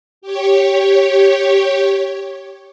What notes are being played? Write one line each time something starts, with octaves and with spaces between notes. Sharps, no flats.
G4 C#5